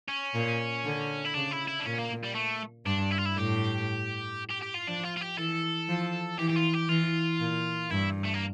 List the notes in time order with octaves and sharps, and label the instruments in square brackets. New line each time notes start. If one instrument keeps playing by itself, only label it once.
[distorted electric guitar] C#4
[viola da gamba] A#2
D3
[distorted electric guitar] E4
[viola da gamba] C#3 [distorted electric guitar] D4
[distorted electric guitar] E4
E4
D4
[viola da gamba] A#2 [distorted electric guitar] C#4
[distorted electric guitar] A#3
G3
A3
[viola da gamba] G2 [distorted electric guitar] D4
[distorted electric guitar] E4
F4
E4
[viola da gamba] A2 [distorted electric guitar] G4
[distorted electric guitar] G4
G4
F4
[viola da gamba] F3 [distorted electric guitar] D4
[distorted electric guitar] F4
F4
G4
[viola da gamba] E3 [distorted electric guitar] A4
[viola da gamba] F3
[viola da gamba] E3 [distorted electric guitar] G4
[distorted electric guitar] G4
F4
G4
[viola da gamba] E3 [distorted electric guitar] F4
[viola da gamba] A#2
[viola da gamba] G2 [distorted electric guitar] E4
[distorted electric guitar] A3
A#3